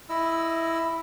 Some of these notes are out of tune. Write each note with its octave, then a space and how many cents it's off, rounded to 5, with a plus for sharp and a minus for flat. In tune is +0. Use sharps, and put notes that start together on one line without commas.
E4 +0 D#5 +0 E6 +20